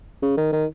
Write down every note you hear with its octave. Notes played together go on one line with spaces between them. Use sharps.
C#3
D#3
D#3